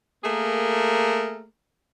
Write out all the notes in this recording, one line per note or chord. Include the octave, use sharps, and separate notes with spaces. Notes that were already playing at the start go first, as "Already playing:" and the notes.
A3 A#3 G#4 A#4